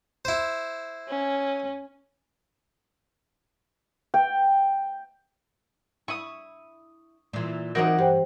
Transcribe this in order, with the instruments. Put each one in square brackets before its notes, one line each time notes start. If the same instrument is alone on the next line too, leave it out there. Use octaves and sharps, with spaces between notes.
[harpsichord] E4 C5
[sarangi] C#4
[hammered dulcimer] G5
[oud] E4 [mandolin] C#6 D#6
[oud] A#2 E3
[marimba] E3 [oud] F#3 C4 D#4 [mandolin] A#4 F#5 D6
[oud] G2 [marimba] G4 C5 G5